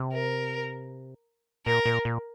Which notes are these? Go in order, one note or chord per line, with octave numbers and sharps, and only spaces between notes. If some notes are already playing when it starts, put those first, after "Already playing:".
Already playing: C3
A#4
A#2 A#4
A#2
A#2